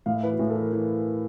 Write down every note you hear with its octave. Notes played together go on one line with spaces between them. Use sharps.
A2 F5
E5
E3 B4
F#4
A2 G#4
A4
E3 A#4
E3